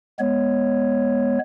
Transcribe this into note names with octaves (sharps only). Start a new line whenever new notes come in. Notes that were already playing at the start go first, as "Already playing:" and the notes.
G#3 B3 C#5